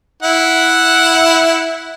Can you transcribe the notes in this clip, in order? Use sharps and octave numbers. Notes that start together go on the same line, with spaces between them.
E4 F#5